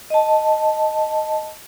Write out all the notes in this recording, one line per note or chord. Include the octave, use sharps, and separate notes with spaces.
D#5 A5